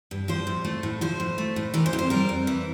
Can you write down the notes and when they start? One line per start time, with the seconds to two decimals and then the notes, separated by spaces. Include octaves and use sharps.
0.11 G2
0.28 F3 C5
0.47 A2
0.65 A3
0.83 A2
1.01 F3 C5
1.20 A2
1.38 A3
1.56 A2
1.74 E3 A#4
1.86 C5
1.93 F2
1.99 C5
2.10 G3 A#4
2.29 F2
2.47 E3